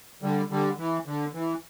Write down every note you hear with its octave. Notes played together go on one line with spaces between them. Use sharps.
D3 G3
D3 G3
E3
D3
E3